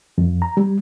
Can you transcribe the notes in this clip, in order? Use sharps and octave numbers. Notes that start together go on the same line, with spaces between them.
F2
A#5
G3